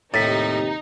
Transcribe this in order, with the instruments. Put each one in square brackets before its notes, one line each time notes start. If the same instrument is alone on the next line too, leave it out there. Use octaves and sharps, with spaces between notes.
[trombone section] D#2 C3 G4 [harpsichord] A2 [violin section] D#4 [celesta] A6 B6